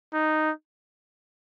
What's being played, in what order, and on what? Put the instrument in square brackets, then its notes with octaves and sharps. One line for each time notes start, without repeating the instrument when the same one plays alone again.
[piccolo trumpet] D#4